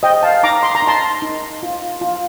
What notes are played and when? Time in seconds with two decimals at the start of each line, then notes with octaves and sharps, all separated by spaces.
0.03 C5 D#5 G5
0.23 F5 A5
0.43 D#4 A#5 D6
0.63 C6
0.75 A#5
0.82 D#4
0.88 A5 C6
1.22 D#4
1.63 F4
2.01 F4